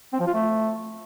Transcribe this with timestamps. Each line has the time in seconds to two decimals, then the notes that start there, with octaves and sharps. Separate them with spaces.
0.13 C4
0.20 F3
0.27 F4
0.34 A3